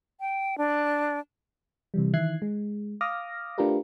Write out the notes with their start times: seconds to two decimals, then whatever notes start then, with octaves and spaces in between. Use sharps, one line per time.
0.20 G5
0.58 D4
1.94 C3 E3 G3
2.13 D#3 E3 E5 F#6 G#6 C7
2.42 G#3
3.01 F5 D6 D#6 F6 A#6
3.58 A3 D4 F4 G4 A#4 B4